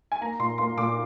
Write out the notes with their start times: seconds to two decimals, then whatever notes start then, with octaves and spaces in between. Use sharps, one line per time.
0.12 G#5
0.21 A#3 A#5
0.39 A#2 C6
0.58 A#3 C6
0.77 A#2 D6